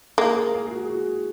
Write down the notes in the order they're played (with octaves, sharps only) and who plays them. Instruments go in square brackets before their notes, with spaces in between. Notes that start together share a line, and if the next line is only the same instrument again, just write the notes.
[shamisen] A#3 [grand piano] G#4
[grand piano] A#4
G#4
G#4
F#4
G#4
F#4